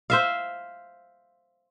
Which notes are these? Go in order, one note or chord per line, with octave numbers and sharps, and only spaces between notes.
C5 E5 F5